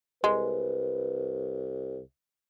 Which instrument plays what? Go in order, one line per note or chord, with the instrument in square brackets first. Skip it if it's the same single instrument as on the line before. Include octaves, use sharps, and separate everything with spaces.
[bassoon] C2 [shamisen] G#3 [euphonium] B4